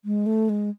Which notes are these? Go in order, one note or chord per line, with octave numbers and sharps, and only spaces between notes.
G#3
A3
G#3